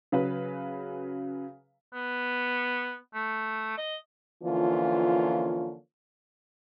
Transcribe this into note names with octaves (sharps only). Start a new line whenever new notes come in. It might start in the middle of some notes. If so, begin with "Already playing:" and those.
C#3 F#3 B4
B3
A3
D#5
D3 E3 F3 A#3 C#4 F4